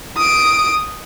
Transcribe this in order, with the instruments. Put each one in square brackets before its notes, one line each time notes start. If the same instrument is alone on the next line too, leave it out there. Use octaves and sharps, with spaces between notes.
[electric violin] D#6 D7